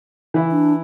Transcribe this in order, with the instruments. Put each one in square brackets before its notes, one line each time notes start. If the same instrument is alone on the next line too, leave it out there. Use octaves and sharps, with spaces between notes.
[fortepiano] E3 E4
[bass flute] D4